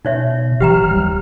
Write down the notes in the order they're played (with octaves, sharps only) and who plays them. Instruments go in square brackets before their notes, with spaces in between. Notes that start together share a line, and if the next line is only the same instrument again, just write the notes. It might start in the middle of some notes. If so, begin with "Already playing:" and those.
[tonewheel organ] B2 [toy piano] D#4 C#5 E5
[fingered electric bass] G#1 E3 F#3 [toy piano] G4 G5 A#5 [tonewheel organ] F6
[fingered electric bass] D#1 A#1 G3